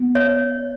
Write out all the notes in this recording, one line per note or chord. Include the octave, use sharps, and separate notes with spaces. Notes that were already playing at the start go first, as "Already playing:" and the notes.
Already playing: B3
C#5